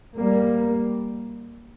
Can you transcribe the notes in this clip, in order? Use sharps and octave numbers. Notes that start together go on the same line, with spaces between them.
G3 A#3